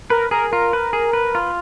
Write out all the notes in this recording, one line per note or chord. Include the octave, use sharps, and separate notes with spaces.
A#4 B4
G#4 A#4
F4 A#4
B4
G#4
B4
F4